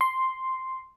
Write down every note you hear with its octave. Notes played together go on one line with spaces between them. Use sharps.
C6